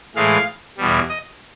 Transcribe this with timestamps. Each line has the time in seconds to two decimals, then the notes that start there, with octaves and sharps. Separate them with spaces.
0.16 A2 E3 G#3 F5
0.78 E2 B2 G3
1.09 D#5